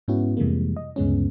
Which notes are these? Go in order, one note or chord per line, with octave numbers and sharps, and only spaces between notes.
G#2 B3 C#4 E4 F#4
F2 C3 E3 G3 G#3 A#3
D#5
D2 G2 C#3 G#3 B3 C#4